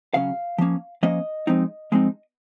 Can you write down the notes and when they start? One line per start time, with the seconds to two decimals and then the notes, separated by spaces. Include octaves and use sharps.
0.14 C#3 F#3 C#4 F5
0.58 F3 A#3 C#4
1.03 F3 A#3 C#4 D#5
1.47 F3 G#3 C4 D#4
1.92 F3 G#3 C4 D#4